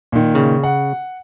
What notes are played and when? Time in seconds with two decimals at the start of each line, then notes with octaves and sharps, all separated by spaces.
0.12 A#2 D#3
0.35 C#3
0.63 F#5